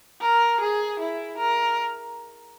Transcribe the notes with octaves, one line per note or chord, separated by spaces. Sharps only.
A#4
G#4
E4
A#4